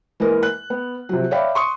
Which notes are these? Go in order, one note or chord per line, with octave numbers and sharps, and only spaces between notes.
E3 G#3 A#3 A#4 B4
F#6
B3
C3 F3 F#3
C#5 D5 E5 F5 G5 B5
C6 C#6 D#6